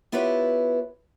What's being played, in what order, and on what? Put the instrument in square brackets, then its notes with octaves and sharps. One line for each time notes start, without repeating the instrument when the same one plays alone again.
[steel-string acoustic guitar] B3 E4 F4 G4 B4 C#5